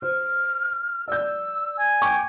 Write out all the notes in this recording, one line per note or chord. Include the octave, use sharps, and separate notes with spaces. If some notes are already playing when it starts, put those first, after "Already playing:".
C5 F6
D5 E6 G6
G#5
G5 C#6 D6